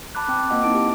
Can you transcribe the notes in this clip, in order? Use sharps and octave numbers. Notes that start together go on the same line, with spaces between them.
A5 B5 D6 F#6
C4 G5 F6
A#3 C4 F4 D#5 F#5 D6
C4 D#4 E4 A5 D7
G4